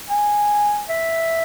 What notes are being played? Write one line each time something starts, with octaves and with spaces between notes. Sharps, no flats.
G#5
E5